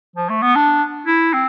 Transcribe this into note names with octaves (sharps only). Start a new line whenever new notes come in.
F3
A3
B3
D4
E4
C4